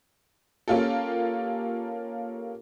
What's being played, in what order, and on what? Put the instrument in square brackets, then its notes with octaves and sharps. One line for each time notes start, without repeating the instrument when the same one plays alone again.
[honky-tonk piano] A#3 C#4 F4 G4 A4